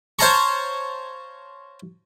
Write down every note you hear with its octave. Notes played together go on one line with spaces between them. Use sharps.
C5 C#5 F5 A5 A#5 C#6